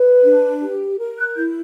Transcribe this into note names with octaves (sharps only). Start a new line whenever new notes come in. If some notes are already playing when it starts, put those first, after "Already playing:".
Already playing: B4
D4
G4
A#4
F#6
E4 G6